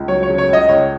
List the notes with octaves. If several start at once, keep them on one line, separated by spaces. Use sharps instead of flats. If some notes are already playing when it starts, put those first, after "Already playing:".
Already playing: C#2
F#3 C#5
C#5
C#3
C#5
C#2 D#5
C#2 C#5